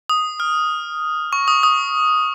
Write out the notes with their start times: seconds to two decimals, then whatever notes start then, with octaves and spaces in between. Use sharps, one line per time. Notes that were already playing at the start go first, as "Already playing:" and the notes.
0.09 D#6
0.40 F6
1.33 C#6
1.48 D#6
1.63 D#6